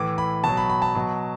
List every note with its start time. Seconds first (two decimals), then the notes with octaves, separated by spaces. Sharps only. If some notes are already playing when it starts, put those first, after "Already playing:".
Already playing: A2 E3 D6
0.18 B5
0.44 B2 F#3 A5
0.57 B5
0.69 B5
0.82 A5
0.95 B2 F#3